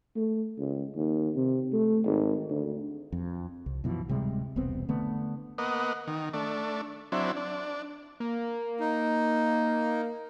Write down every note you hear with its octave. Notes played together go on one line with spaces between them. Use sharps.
A3
C#2
D#2
C3
A3
G#1
D2
F2
C2
F#2 B2 E3 F3
D1 C3 G3 G#3
E1 C2 B3 C4
D3 A3 B3
A#3 B3 D#5 F#5
D#3
A3 D4
F#3 C4 D4 E4
D4
A#3
D#4